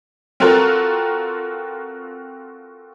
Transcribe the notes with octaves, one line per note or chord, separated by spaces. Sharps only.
C4 F4 F#4 A4 A#4